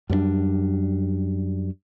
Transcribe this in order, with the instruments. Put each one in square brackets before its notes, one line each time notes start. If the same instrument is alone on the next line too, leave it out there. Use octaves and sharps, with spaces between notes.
[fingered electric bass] F#2 G3 B3 D4